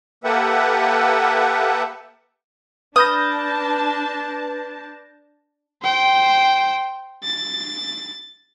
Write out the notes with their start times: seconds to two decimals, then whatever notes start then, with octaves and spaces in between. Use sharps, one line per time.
0.24 A#3 G4 A4 B4 E5 F#5
2.96 D4 B4 A5 B5 D#6 F6 G6 A#6
5.83 C5 G5
7.24 A6